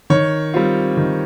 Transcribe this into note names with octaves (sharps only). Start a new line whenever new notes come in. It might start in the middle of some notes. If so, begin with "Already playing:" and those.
D#3 C#5
G3 C4 F4
D#3